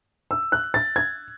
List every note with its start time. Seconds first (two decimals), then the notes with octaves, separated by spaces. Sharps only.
0.31 E6
0.52 F#6
0.74 A6
0.96 G#6